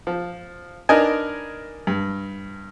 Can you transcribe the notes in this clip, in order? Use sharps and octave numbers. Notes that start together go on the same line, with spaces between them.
F3
D4 D#4 A#4 B4 D#5 G#5
G2